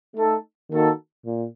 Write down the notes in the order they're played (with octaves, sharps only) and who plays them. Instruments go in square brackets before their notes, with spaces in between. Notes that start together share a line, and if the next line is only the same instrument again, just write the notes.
[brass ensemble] A3 D#4 A4
D#3 A#3 D#4 F#4 A4
A#2